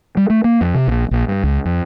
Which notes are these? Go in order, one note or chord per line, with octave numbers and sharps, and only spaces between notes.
G3
A3
A#3
F2
C3
A#1
A#1
G2
C#2
F2